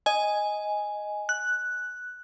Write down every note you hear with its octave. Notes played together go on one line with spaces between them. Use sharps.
D#5 G#5
F#6